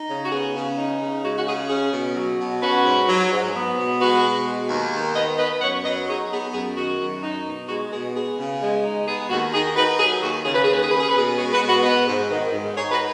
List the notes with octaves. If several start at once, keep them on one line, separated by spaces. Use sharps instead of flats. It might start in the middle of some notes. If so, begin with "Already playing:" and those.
Already playing: D#4
C#3
F#4
B3 G#4
C#3
D#4
C#3
G#3 F#4
F#4
C#3 G#4
C#4 G#4
B2
F#3
B2
C#4 F#4 B4
G#2
F#3
G#2
B3
B2
G#3 F#4 B4
B2
G#3
D#2
D#3
B3 B4 D#5
B3 B4 D#5
F#2 C#5 F#5
F#3 B4 D#5
D#4 G#4 C#5
B3 G#4
F#2 G#4
D#3 F#4
F#2
D#4
B2
G#3 F#4
B2 G#4
B3 G#4
C#3
G#3
D#4
B3 G#4
D#2 F#4
D#3 G#4
D#4 F#4 B4
F#3 G#4
D#2 F#4
C#3 G#4
B4
G#4
D#2 B4
G#4
C#4 B4
G#4
B4
B2 G#4
G#3 G#4 C#5
F#4 B4
B2
F#4 B4
B3 B4 D#5
G#2
D#3
G#2
D#4 G#4 C#5
F#4 B4